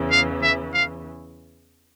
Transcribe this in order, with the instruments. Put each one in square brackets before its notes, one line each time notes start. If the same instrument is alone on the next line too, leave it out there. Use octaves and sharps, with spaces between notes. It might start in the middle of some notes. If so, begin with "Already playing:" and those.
Already playing: [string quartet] E2 C#3 E3
[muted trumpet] F5
E5
F5